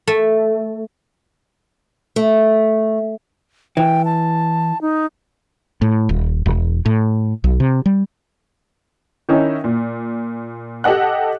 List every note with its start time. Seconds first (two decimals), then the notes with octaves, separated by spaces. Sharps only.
0.07 A3
2.16 A3
3.77 E3 G5
4.05 A5
4.81 D#4
5.82 A2
6.09 D#1
6.46 E1
6.86 A2
7.44 B1
7.60 C3
7.86 G3
9.29 D#3 C#4 D#4 E4
9.64 A#2
10.84 G4 A4 D#5 F#5 F#6